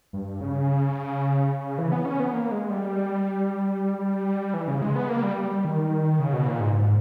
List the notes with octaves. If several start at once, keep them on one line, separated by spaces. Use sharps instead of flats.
G2
C#3
E3
B3
C#4
B3
A#3
G#3
G3
G3
E3
C#3
G#3
B3
A#3
G3
G3
G3
D#3
C#3
B2
A#2
G#2
G#2